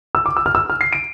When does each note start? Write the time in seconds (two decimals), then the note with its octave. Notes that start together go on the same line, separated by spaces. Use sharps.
0.15 E6
0.26 D6
0.37 E6
0.46 F6
0.55 E6
0.70 F6
0.81 C7
0.93 D7